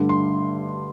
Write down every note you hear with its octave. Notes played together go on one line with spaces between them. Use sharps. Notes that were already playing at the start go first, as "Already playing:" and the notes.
Already playing: G2 D3 A3 D4
C6